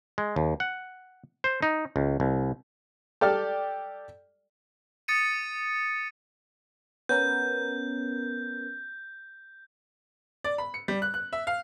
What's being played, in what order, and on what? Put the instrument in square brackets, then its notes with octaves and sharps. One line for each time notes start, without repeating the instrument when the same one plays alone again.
[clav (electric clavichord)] G#3
D#2
F#5
C5
D#4
C#2
C2
[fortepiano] G4 A4 D5 F6
[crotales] D#6 A6 C#7 D#7
[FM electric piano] B3 C#4 A#4 [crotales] G6
[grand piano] D5
B5
C#7
G3
F#6
F#6
E5
F5